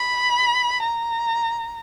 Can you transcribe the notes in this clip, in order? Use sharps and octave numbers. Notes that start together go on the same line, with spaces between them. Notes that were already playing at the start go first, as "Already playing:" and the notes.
Already playing: B5
A#5